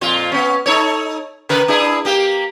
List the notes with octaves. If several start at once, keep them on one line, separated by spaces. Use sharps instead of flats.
F2 A#2 F4
B3 C#4
D#4 A4 C#5
C#3 A#4 B4
D4 E4 G#4
A#3 G4